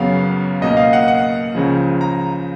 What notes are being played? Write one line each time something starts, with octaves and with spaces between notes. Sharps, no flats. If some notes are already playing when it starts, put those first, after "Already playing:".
Already playing: F#2 C#3 F#3 B3 F5
C#2 B2 A#3 D#5
F5
F#5
F#5
C#2 C#3 F3
A#5